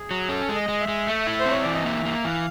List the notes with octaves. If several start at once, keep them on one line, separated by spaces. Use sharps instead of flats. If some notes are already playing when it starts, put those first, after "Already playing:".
Already playing: G#4
F#3
C#4 A4
G#3
D#5
G#3
E5
G#3
A3
E4
C5
C4
C#5
E3 D5
D#5
A#3 E5
A#3
E3 F5